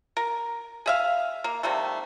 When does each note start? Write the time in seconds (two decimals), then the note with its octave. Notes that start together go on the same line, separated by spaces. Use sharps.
0.17 A#4
0.86 G#4 E5 F5
1.44 A#3
1.63 C3 D#3 G3 A3